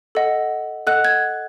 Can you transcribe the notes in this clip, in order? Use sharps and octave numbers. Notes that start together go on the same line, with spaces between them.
A4 D#5 F#5
A4 D#5 F#5 F#6
G#6